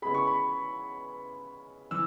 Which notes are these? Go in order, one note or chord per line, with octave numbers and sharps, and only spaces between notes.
C#3 G#3 B3 E4 G#4 B5
C#6
B5
E3 E6